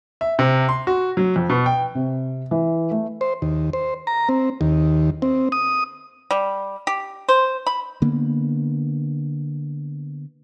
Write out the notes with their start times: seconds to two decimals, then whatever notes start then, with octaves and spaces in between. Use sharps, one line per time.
0.21 E5
0.39 C3
0.69 C6
0.87 F#4
1.17 F#3
1.36 F2
1.49 B2
1.66 G5
1.95 C3
2.51 E3
2.91 A3
3.21 C5
3.42 D#2
3.73 C5
4.07 A#5
4.29 C4
4.61 D#2
5.22 C4
5.52 D#6
6.31 G3
6.87 G4
7.29 C5
7.67 B5
8.02 D3 A#3 B3